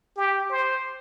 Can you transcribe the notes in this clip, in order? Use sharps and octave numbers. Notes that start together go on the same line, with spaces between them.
G4
C5